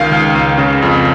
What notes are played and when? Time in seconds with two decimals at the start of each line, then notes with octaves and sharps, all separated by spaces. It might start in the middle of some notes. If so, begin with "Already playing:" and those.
Already playing: C#2 D#3 F5
0.12 C#2
0.35 C#2
0.58 C#3
0.82 F2